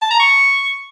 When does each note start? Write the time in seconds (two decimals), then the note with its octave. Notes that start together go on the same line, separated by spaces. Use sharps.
0.02 A5
0.11 A#5
0.19 C#6